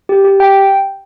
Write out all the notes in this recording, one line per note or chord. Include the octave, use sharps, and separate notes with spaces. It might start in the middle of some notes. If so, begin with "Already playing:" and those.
G4
G4
G5